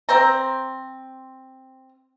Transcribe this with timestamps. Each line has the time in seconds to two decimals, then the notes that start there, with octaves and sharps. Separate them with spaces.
0.09 C4 C5 A#5